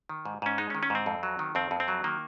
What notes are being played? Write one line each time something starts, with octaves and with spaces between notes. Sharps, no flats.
D#3
G#2
G#2 C#4
G#3 D#4
C#4
D#3
C#4
G#2 C4
F2
F#3
D#3
F2 C4
F2
C4
F#3
D#3 A#3